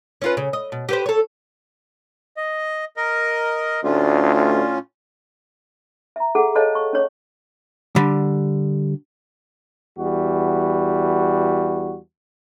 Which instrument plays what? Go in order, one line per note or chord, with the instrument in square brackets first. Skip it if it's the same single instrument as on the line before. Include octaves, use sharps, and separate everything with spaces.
[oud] C#4 F4 B4
C#3
D#5
B2
G4 B4 C5
A4 C#5
[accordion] D#5
A#4 D#5
[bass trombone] D2 [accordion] A2 C#4 F4 [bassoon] D4
[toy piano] E5 A#5
G#4 A4 F#5
A4 C5 C#5 D#5 F5 A5
C#6
C#4 C#5
[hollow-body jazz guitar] D3 G3
[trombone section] E2 G3 F#4